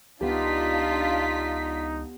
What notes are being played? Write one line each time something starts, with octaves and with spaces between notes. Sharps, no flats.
C#2 B3 D4 D#4 F4 G4 B6